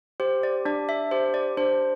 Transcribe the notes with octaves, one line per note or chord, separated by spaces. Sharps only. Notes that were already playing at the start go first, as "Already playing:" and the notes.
G4 C5
D5
D4 D5
E5
G4 C5
D5
D4 C5